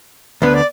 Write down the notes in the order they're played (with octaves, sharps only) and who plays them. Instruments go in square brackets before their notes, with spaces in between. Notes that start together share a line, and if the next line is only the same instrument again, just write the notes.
[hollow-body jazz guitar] D2 D3 B3 [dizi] B4
[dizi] D5